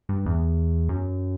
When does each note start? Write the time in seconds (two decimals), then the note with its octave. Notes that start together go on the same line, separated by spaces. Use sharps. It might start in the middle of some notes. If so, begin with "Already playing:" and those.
0.09 G2
0.26 E2
0.89 F#2